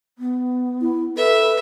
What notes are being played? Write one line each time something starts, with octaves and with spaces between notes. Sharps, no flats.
B3
E4
A4 B4 E5